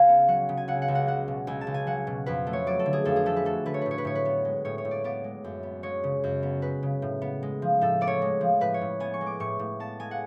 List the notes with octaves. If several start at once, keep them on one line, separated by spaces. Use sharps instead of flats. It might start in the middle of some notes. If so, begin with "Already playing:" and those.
Already playing: C#2 F5 G#5
B3
F#3 F#5
C#3
G#5
C#2 F#5
F#5
C#2
F#5
F#3 F#5
B2
C#2 G#5
A5
C#2
G#5
F#3 F#5
B2
F2 B4
A3
C#5
F#3 D5
A4
D3
G#4
F2 A4
G#4
A3 A4
B4
F#3 A4
D3 B4
C#5
A2 B4
C#5
B4
A2 C#5
B4
B3
G#3
A2 C#5
C#5
A2
D5
B3 D5
G#3
F#2
B3
G#3 C#5
C#3
F#2
B3
G#3 B4
C#3
A2
B3
G#3
F3
A2 A4
B3 D5
C#5
G#3
F3
A2 B4
C#5
A2
B3 G#5
C#6
G#3
D6
A2 C#6
A2
B3 A5
G#3 G#5
F#5